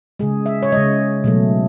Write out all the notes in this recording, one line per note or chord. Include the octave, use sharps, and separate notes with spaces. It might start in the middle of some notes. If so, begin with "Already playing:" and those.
C#3 G#3 G#4
E5
C#5
C#3 G#3 D#5
B2 F#3 A3